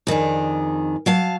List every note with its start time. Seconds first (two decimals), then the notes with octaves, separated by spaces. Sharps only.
0.07 F2 D#3 D4 G#4
1.06 F#3 F5 A5